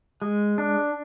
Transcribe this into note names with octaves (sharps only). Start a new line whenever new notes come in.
G#3
D4